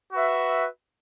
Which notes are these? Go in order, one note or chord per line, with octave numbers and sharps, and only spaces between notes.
F#4 B4 E5